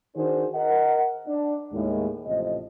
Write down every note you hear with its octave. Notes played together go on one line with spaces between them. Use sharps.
D#3 D4 D#4 F#4 G#4 C5
A#4 D#5 F#5
D4
D#2 A2 G#3
A1 A2 C3 F3 D#5